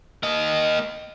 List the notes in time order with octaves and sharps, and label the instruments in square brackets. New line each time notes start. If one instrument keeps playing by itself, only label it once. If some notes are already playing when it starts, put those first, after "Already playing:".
[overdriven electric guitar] A#3 D#5